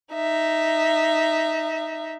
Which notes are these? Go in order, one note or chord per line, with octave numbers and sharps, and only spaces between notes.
D#4 E5